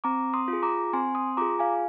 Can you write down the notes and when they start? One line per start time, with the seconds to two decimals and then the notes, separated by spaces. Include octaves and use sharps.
0.04 C4 A#5 D6
0.34 C6 D#6
0.48 F4
0.53 G#4
0.63 A#5 D6
0.93 C4 G#5 C6
1.15 C6 D#6
1.37 F4 G#4 A#5 D6
1.59 F5 G#5